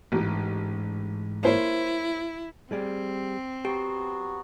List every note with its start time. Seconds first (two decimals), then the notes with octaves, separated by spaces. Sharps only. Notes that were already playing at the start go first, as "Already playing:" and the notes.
0.12 A1 G#2 E3
1.44 A#3 E4 C5 C#5
2.71 G3 C4 G#4 D5
3.65 F#3 B3 F#4 G4 G5